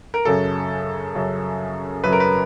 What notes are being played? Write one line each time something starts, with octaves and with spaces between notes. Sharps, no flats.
A#4
F#2 C#3 F#3 A4
F#2 C#3 F#3
F#2 C#3 F#3 B4
A#4
B4